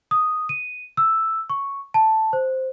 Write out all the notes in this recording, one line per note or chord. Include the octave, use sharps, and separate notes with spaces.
D#6
D#7
E6
C#6
A5
C5